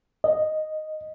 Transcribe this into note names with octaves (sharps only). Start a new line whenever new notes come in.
D#5